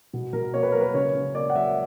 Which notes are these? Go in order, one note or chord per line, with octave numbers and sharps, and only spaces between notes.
B2
B2 A#4
A#3 C#5
B4
F#3 A#4
B4
C#3 C#5
C#3
A#3 D5
F#5
F#3 E5